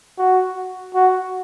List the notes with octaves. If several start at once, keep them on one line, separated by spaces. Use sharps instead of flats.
F#4
F#4